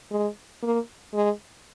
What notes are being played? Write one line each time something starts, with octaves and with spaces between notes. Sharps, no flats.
G#3
A#3
G#3